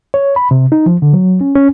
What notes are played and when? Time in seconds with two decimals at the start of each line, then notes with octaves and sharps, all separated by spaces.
0.14 C#5
0.36 B5
0.51 C3
0.72 D#4
0.86 F3
1.02 D3
1.13 F#3
1.41 C#4
1.56 C#4